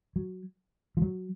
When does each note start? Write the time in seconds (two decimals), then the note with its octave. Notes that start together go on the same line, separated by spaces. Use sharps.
0.16 F#3
0.97 F3
1.02 F#3